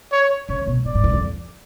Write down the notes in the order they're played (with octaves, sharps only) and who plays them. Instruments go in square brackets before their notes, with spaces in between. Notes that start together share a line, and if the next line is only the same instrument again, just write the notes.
[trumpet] C#5
[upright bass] C#3 [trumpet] C#5
[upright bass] B2
[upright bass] A2 [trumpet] D5
[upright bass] G#2
F#2
F2